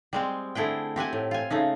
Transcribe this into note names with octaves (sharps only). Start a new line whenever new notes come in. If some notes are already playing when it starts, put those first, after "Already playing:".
G3 G#3 C4
D3 A3 E4 G#4 G5
C4 G4 F#5 G#5
A2
F4 G#5
C#3 A3 D#4